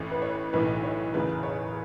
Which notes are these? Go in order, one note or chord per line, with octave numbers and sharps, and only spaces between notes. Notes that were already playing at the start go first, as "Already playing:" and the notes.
Already playing: A1 A2 E3
B4
C#5
B1 A2 E3 B4
C#5
F#1 E2 C#3 B4
C#5